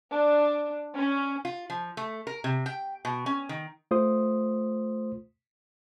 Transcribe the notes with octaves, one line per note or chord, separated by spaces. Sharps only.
D4
C#4
F4
F3
A3
A#4
C3
G5
B2
C#4
D#3
A3 F4 C5 C6 D#6